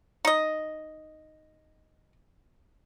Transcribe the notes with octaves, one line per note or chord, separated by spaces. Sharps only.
D#4 D#5